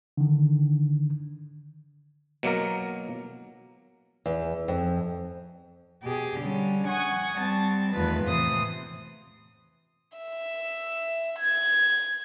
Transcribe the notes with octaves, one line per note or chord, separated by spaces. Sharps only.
D3 D#3
B2 F#3 A#3 A#4
E2
F2
B2 G4 G#4
D3 G3 C#4
F#5 G#5 C#6 D#6 G#6
G3 C4 A5
E2 D#3 A3 B3 F4 B4
A2 C3 E3 C5 D#6
E5
G#6